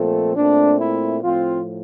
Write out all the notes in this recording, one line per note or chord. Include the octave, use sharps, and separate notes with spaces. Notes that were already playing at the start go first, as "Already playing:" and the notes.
Already playing: A#2 F3 A3 C4 A4
A#2 A3 C4 D4
E4
A2 F3 C4 F4